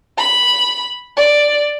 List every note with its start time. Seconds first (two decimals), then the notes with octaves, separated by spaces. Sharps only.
0.17 B5
1.17 D5